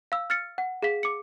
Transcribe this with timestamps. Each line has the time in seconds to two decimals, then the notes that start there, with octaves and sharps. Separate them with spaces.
0.12 F5 E6
0.30 F6 A6 C#7
0.58 F#5
0.83 G#4 F5 B6
1.03 D6 C#7